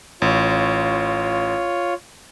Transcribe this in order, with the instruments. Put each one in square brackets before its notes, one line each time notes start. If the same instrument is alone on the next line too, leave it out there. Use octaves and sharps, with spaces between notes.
[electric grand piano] A1 [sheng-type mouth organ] F4 C#5